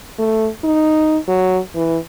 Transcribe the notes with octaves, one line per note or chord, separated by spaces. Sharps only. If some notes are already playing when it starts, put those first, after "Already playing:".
A3
D#4
F#3
E3